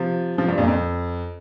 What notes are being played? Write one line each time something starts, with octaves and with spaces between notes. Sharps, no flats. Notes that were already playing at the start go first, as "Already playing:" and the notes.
Already playing: C3 F3
C3 F3
G2
F2 A#2
F2